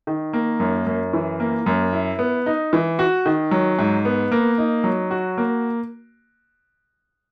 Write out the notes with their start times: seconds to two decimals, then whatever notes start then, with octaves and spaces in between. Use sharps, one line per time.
0.07 D#3
0.33 A#3
0.60 F#2
0.87 F#2
1.13 E3
1.40 A#3
1.66 F#2
1.93 E4
2.19 B3
2.46 D#4
2.73 E3
2.99 F#4
3.26 D#3
3.51 F#3
3.79 G#2
4.05 B3
4.32 A#3
4.58 D#4
4.84 F#3
5.11 F#4
5.38 A#3